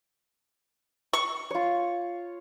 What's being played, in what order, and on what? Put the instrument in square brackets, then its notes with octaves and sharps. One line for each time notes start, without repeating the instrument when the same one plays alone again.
[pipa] C#6
[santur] F4 C#5